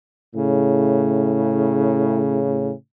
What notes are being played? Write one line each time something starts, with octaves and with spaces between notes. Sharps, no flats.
A2 C#3